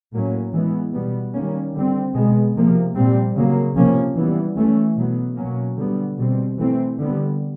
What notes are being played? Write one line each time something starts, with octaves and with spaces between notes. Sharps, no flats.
A2 F#3 A#3 C#4
E3 G#3 B3
B2 G3 B3
D#3 G3 A#3 C#4
D3 G3 C4
B2 G#3 B3
C3 F3 A#3
A#2 G3 C4
C#3 F#3 A#3
C3 F3 A#3 C#4
E3 G3 B3
E3 A3 C#4
B2 F#3 B3
B2 F#3 A#3 C#4
D3 G3 B3
B2 G3 C4
E3 A3 C4
D3 G3 B3